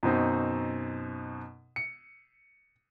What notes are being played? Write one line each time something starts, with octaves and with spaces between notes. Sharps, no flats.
F#2 B2 C4 D#4
C#7